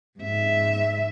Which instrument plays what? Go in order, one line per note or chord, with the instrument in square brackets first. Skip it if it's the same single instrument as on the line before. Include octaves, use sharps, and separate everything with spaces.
[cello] G#2 E5